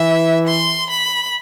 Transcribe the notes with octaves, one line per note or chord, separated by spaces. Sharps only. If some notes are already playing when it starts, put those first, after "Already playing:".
Already playing: E3 E5
C6
B5